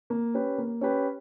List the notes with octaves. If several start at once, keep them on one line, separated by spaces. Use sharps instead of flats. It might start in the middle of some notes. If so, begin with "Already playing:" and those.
A#3
C#4 G4 B4
A#3
C#4 G4 B4